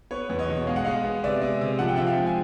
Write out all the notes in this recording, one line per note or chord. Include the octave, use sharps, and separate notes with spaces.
B3 B4 C#5
E2
C#5 D#5
B2
G#3 F5
F#5
G#3 D#5 F5
B3
C3 D5 E5
G#3
C3
F3 F#5
G5
F3 E5 F#5
F5 G5
G#3
G#5